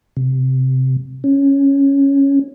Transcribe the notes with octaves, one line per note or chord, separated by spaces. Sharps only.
C3
C#4